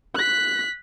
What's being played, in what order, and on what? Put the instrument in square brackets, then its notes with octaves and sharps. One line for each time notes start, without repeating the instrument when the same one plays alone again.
[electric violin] F#6 B6